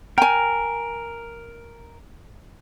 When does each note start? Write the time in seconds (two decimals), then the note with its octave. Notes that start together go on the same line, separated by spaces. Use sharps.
0.18 A#4 G5 G#5